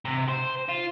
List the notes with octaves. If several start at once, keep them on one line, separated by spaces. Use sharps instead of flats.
C3
C5
F4